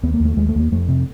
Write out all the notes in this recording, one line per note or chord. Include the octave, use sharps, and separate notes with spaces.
D#2 B3
A#3
D#2
A3
D#2 G#3
A3
D#2 A#3
F2 A3
C3